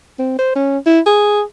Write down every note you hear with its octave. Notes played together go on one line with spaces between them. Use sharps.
C4
C5
C#4
E4
G#4